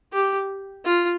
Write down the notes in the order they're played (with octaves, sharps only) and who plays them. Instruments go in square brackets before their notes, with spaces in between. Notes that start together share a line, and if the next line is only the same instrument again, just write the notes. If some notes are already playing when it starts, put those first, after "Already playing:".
[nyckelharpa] G4
F4